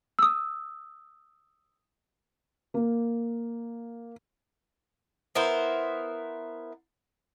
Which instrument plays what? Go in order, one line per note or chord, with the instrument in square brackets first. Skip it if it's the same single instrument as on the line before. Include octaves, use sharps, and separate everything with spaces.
[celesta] D#6 E6
[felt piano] A#3
[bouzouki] B3 E4 A#4 C5